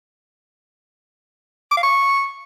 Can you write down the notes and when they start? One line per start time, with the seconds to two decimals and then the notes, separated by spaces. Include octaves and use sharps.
1.71 D6
1.77 F5
1.83 C#6